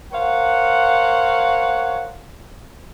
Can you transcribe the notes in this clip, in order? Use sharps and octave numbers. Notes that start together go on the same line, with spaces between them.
A#4 C5 C#5 F5 F#5